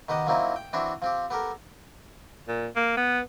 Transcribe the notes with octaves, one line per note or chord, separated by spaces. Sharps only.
D#3 B3 G4 D#5 F#5
F3 F#3 A#3 C4 D#4 E4
G5
E3 C4 D4 E4 F#4 E5
F3 C4 G4
B3 G4 A4 A#4
A#2
A#3
B3